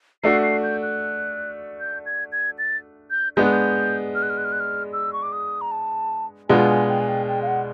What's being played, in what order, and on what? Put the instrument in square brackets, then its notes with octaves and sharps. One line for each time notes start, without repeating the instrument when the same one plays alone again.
[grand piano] A3 D4 F#4 [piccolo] C7
[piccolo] C7
G6
F#6
G6
G#6
G#6
A6
G6
[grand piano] G#3 B3 D4 [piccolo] G6
[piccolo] F#6
G6
F6
F#6
F6
F#6
F6
F#6
F6
E6
C#6
D6
D#6
A#5
A5
[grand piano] B2 G#3 B3 D4 F4 [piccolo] G#5
[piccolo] G#5
G5
G#5
G5
G5
F5
F#5